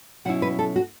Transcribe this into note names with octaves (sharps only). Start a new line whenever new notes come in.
B2 F#3 C#4 E4 F#5
B4
A4
F#4